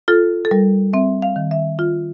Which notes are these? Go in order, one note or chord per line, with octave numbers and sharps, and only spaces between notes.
F4 A4
A4
G3 A#4
C4 E5
F5
D#3
E5
F4